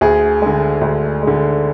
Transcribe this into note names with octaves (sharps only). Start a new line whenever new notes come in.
D2 G#4
D3 G#3
D2
D3 G#3